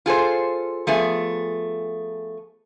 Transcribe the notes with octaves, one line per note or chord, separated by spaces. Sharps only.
F4 G#4 A4 C5
F3 A3 B3 G#4